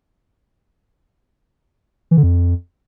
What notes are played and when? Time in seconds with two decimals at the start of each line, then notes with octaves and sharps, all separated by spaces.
2.11 E3
2.17 D3
2.23 F2